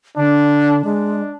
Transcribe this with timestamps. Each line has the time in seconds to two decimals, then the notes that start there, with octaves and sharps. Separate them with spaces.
0.17 D3 D4
0.84 G#3 D4